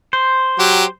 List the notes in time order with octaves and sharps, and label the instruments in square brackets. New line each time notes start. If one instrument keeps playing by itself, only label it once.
[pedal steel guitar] C5
[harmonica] F#3 G4